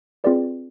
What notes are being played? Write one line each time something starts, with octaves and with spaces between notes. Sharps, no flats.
C4 F4 G#4 B4 D5